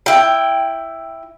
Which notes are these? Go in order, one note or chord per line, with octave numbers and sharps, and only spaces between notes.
E4 G5